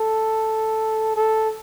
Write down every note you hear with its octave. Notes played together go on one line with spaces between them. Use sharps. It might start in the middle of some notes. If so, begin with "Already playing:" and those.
Already playing: A4
A4